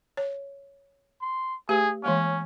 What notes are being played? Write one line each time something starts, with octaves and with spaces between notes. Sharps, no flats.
C#5
C6
A3 G4 G#4 B4
E3 G#3 A#3 C#4